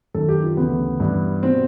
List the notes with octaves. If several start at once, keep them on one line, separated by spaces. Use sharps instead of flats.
F#2 D#3 A4
G4
F4
D2 C#3 E3 B3
G2 E3
B2 C4